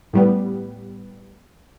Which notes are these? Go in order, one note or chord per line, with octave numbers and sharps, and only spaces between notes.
A2 G3 B3